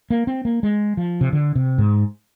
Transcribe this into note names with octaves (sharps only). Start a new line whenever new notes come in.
A#3
C4
A#3
G#3
F3
C3
D3
C3
G#2